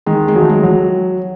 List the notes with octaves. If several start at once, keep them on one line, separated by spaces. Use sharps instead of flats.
D#3 G#3
G#3
F#3 A3
G#3
F#3